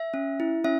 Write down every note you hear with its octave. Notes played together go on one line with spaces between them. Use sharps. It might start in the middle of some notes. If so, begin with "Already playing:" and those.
Already playing: E5
C#4
E4
C#4 E5